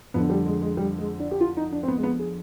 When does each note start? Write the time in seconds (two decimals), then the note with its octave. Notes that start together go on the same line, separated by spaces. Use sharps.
0.14 F2 D3 B3
0.30 G3
0.46 G#3
0.62 G#3
0.77 G3
0.98 G#3
1.20 D4
1.31 G4
1.41 F4
1.57 D#4
1.72 D4
1.83 C4
1.88 B3
1.96 G#3
2.03 B3
2.19 G#4